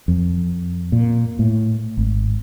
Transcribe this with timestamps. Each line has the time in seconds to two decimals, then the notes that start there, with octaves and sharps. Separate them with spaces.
0.08 F2
0.92 A#2
1.39 A2
1.97 G#1